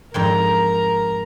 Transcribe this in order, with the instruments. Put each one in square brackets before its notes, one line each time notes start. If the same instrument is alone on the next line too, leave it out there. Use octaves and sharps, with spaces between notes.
[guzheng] F2 G#2 G5 [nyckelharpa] A#4 A#5